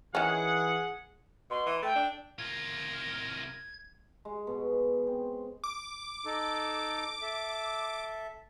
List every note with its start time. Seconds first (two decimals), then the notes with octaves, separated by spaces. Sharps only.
0.15 D#3 E3 C#4 G#4 F#5
1.50 B2 C6
1.66 E3
1.83 A3 G5
1.96 D4
2.39 C2 F4 A#4 G#6
4.25 G#3
4.47 B2
5.07 C4
5.64 D6
6.25 D#4 A4
7.22 A4 E5